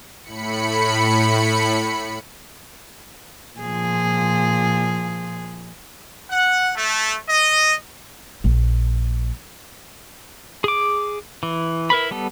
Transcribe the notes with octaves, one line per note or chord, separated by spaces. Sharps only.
A2 B5 C#7
A#2 F3 G#4
F#5
A3
D#5
A#1
G#4 D6
E3
E4 A#4 B4 B5
G3 B3 A4